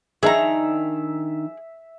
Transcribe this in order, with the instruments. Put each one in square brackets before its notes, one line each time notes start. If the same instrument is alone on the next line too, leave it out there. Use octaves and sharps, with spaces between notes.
[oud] D#3 D4 D#4 [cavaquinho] G#4 A#5 [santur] E5